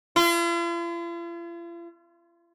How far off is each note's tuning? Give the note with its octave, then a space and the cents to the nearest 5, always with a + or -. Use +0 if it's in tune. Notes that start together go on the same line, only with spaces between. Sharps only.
F4 -45